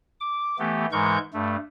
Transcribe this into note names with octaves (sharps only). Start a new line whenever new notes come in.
D6
E3 A3 B3 G4
G#2 E3 G#3 A#4 C#6 G6
G2 A3